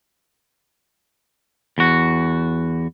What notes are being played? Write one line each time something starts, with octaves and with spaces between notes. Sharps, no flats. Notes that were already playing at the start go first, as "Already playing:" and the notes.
E2 F#4